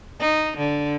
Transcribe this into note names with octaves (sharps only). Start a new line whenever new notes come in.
D#4
D3